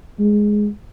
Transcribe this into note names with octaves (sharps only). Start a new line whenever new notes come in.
G#3